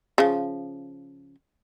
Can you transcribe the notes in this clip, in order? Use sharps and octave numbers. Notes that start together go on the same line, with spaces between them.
C#3 F3